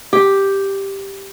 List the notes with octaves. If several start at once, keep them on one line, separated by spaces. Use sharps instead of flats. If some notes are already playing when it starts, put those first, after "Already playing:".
G4